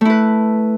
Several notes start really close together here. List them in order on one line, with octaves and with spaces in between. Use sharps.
A3 E4 B4